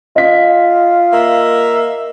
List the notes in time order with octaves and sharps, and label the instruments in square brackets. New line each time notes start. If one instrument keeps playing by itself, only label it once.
[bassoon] F4 [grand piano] D#5 B6
[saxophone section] A#3 A#4 E5